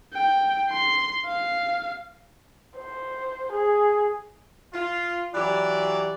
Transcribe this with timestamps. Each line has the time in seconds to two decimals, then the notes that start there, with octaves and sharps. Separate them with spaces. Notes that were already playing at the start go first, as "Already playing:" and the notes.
0.13 G5
0.70 C6
1.26 F5
2.78 C5
3.53 G#4
4.74 F4
5.35 E3 F#3 G4 D5